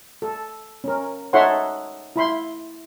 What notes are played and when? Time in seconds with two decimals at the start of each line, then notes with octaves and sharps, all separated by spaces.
0.22 A4
0.84 C#4 A#4
1.33 D#4 A4 C#5 E5 F#5 C6
2.16 E4 B5 C6